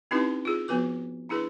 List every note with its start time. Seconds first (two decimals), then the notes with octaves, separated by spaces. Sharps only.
0.11 C4 C#4 D#4 E4 G4 B4
0.45 F4 G#4
0.68 F3 B3 F#4 B4 D6
1.29 D4 E4 G#4 B4